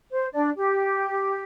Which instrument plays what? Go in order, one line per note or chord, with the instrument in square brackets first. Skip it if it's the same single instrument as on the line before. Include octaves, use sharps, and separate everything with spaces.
[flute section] C5
D4 D5
G4